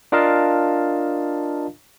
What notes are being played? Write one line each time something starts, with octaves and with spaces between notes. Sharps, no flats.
D4 F4 A#4 D#5 F5 A5